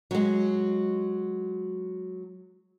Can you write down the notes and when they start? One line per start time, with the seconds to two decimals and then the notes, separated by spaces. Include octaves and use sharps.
0.11 F#3 G#3